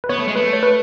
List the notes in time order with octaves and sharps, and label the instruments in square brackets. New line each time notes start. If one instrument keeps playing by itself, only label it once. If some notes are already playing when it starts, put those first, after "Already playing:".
[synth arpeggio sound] B4
[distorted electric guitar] B3 [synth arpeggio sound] C#5
[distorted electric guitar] A3
G#3
[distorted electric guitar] A3 [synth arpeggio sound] B4
[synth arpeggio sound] C#5
B4